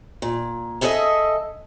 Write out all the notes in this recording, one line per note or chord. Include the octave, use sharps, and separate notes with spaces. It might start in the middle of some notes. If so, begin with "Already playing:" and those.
A#2
E4 G#4 A4 B4 D#5 E5